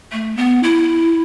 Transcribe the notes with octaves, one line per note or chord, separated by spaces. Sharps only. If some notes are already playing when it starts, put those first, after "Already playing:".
A3
B3
E4